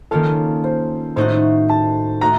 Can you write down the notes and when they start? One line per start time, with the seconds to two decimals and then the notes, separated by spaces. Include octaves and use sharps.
0.11 D#3 A#3 C#4 F4 A4
0.64 C5
1.16 A2 A3 D#4 F#4 C5
1.69 A5
2.21 A3 D#4 F#4 A#5